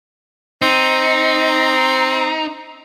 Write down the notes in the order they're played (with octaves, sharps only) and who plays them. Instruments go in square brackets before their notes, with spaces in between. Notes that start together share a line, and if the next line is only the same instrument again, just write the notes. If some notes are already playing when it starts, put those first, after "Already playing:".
[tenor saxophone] C4 [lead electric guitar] D#4